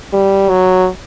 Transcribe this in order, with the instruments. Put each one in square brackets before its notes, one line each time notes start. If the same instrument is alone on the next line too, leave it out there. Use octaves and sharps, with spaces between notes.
[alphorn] G3
F#3